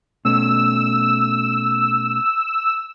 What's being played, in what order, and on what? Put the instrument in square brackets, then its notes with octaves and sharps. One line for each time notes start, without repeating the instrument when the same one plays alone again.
[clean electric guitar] B2 A3 C#4 [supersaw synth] E6